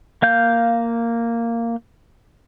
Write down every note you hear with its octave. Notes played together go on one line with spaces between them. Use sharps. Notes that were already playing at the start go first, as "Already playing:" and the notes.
A#3 F5 G6